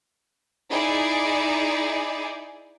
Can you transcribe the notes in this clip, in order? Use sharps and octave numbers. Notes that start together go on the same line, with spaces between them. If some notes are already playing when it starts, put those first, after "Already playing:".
D#4 E4 G#4 D5